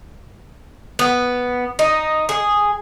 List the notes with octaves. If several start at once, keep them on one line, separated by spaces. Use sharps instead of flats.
B3
D#4
G#4